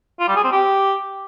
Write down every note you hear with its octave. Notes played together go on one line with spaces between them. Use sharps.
F4
G3
G#4
C4
G4